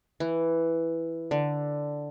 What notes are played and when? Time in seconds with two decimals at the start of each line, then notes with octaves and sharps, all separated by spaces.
0.20 E3
1.31 D3